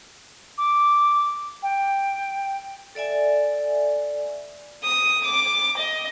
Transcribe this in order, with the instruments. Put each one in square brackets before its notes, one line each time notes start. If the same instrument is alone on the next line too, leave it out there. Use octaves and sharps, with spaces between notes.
[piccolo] D6
G5
[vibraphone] A4 D5 E5 G#5
[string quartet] D#6
D6
D#5